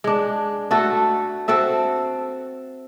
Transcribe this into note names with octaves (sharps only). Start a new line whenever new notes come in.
G#3 D4
A3 F#4 A4
C4 F#4 A4 E5